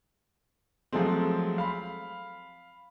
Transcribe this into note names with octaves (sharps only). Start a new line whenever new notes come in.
F3 F#3 G#3 A3 C4
F5 B5